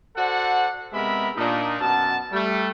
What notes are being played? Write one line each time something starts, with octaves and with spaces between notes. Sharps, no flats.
F#4 A4 C5 D5 F#5
C3 G#3 B3 A#4 E5 B5
A#2 D4 D#4
F#2 B2 F#4 A5
G3 A3